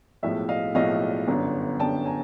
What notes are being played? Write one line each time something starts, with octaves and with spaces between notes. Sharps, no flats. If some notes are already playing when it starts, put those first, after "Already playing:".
B1 A2 F3 G#3 E5
D#5 F5
B1 A2 F3 G#3 D#5 F5
G1 F#2 D3
G1 F#2 D3 G5 A5
G#5 A#5